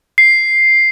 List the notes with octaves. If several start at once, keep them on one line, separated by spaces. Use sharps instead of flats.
C7